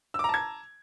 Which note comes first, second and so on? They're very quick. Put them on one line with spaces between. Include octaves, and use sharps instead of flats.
E6 D6 A#5 A5 G#6